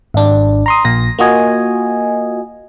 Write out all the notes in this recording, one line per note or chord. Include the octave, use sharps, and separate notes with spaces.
G#1 D4
A#5 C6 D#6
A#1 A#2 A#6
A#3 F4 F#4 D#5 G#5